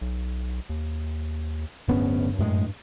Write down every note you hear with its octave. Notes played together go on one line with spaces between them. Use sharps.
B1
D#2
D1 G2 B3 C#4
F#2 A2 G#3